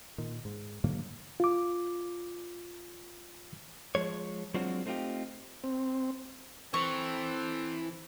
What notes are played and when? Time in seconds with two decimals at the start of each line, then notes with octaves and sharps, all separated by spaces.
0.18 A#2 D#3
0.45 G#2
0.84 G#2 D3 F#3 A#3
1.40 F4 D6
3.95 F3 G#3 C#5
4.54 F#3 G#3 C4 D4 F4 F#4
4.86 A3 C4 D#4 F4 G4
5.64 C4
6.74 E3 C4 A4 C#6